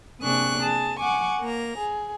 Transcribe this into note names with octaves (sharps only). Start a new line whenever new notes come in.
C3 A#3 D4 G#4 C#6 F#6
G#4 A5
F#5 G#5 C#6 D6
A#3 A#5
G#4